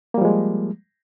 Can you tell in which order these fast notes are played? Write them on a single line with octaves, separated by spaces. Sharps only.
A#3 G3 F3 G#3